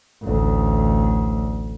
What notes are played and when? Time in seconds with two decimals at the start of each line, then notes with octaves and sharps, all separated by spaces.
0.22 A1 D2